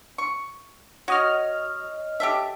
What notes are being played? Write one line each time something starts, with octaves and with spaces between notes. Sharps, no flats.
C#6
F#4 C#5 D#5 F6
G4 A4 E5